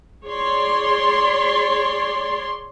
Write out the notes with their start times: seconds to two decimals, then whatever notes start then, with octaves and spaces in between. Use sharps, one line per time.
0.24 G#4 C#5 D5 C6